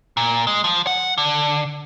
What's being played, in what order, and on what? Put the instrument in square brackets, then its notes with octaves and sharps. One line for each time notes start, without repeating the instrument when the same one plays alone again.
[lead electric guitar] A#2
G#3
F3
F#5
D3